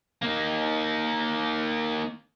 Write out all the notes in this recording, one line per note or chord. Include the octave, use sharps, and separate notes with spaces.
A#3 D#4